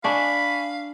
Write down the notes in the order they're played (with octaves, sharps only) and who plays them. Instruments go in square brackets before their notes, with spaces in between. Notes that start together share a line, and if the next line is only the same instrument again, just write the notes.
[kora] D4 E5 [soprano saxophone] F5 [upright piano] G#5 C#6 [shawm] B5